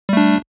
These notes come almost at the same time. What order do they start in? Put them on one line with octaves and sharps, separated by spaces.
G3 A3 D4